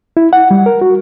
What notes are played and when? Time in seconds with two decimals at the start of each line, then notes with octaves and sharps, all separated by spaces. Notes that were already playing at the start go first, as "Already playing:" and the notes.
0.17 E4
0.33 F#5
0.51 G3
0.66 A#4
0.81 F#4